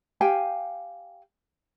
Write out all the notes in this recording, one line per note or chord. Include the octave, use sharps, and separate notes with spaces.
G4 F5 G5 G#5